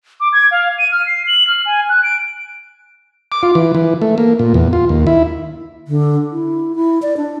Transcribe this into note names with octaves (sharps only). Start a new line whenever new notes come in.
D6
G#6
F5
D#7
F6
C7
F#7
F6
G#5
F#6
D7
D6
F4
E3
E3
A3
A#3
A#2
E2
F4
D#2
E4
D3
E4
E4
D5
D4